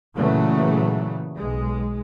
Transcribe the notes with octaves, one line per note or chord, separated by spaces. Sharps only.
A#2 C#3 E3 F#3 A3
B1 G#3